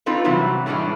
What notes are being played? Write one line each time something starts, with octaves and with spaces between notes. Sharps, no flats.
C4 D#4 F4 A4 B4
C3 E3 F#3 G3 C4
A2 E3 G3 G#3 D4